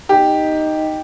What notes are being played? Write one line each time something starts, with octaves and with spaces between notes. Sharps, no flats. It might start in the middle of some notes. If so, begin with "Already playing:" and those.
D#4 G4